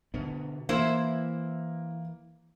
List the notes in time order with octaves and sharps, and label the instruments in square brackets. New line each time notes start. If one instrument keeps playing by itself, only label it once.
[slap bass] B2 D3 B3
[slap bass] E3 [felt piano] A#3 [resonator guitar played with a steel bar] E4 C5